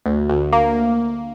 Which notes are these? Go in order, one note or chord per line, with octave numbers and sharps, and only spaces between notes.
D2
D2
A#3